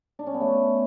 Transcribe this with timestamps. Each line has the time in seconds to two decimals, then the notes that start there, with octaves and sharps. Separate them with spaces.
0.19 D4
0.27 C#4
0.34 B3
0.41 A3